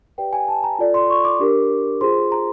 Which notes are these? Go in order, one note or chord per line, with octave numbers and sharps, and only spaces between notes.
G4 B4 D5 G5
G#5
A5
A#5
F4 A4 D5
C6
C#6
D6
D4 G4 A#4
F4 G#4 C5 C6
A#5